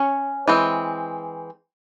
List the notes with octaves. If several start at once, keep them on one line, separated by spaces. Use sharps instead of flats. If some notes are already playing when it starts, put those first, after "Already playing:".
Already playing: C#4 C#5
E3 G#3 C4